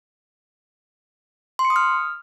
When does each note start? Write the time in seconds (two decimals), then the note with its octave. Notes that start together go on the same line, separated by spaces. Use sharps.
1.59 C6
1.65 C#7
1.70 D#6
1.76 F6